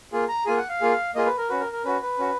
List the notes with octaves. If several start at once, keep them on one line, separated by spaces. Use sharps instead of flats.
A#3 F4 G#4
A#5
A#3 F4 G#4 G#5
F#5
F5
A#3 F4 G#4
A#3 F4 G#4 D#5
B4
A#4
C#4 F#4 B4
A#4
A#4
C#4 F#4 B4
B4
C#4 F#4